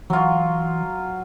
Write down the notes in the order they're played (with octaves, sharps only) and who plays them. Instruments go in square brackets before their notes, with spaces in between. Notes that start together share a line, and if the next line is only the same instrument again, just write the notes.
[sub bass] E3 [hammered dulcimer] F#3 F4